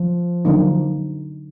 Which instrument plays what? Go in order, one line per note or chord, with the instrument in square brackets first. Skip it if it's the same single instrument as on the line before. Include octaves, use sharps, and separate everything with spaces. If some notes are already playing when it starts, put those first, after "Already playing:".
Already playing: [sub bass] F3
[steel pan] D3 F#3 A#3 D#4